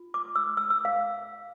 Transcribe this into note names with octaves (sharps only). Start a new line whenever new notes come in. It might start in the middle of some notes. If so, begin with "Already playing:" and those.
Already playing: F4
D6
E6
E6
E6
F5